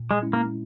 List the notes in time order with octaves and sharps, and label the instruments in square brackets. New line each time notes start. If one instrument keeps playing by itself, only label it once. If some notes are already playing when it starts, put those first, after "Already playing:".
Already playing: [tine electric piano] A#2
[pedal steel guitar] G#3
[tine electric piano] G#3 C#4 E4
[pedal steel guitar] A#3